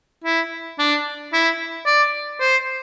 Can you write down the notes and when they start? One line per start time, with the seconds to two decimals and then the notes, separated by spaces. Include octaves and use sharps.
0.24 E4
0.79 D4
1.33 E4
1.86 D5
2.40 C5